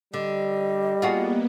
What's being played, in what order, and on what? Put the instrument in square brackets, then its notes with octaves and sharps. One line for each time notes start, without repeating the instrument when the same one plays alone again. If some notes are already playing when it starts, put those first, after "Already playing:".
[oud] D3 [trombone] G3 [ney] D#5
[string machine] A#3 B3 [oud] F4 F#4 G#4